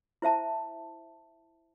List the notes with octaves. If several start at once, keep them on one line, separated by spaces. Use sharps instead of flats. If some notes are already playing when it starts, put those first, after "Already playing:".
E4 C5 E5 A5